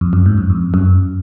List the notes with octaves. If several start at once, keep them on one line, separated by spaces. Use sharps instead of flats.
F2
F#2
G#2
F#2
F2
F#2